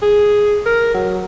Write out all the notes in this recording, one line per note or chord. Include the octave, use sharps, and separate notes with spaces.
G#4
A#4
F#3